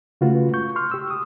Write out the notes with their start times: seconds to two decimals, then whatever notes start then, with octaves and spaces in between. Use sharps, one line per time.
0.21 C#3 G#3 A3 F4 F#4 B4
0.54 C#6 G6
0.76 C6 C#6 F6
0.91 G4 E6
1.10 D#6